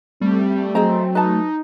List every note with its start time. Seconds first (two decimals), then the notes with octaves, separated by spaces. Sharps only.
0.21 G3 A3 C4
0.75 F#3 C4 G#4 D#5 A#5
1.15 D#4 B4 A5